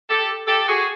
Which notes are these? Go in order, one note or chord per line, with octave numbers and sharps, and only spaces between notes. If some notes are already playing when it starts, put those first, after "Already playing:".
G4 A4
G4 A4
F#4 G#4